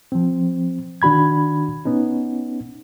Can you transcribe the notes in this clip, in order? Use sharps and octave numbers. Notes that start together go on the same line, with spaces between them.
F3 C4
D#3 D4 F#4 B5 G#6
B3 C#4 D#4